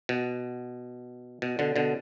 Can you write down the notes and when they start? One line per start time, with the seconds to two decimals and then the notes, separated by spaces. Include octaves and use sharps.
0.09 B2
1.42 B2
1.59 B2 D3
1.76 B2 D3